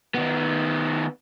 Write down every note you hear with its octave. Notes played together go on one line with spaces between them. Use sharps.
D#3 B3